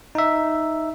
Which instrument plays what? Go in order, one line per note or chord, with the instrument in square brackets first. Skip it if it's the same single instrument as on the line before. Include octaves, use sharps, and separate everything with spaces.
[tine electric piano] D#4 E5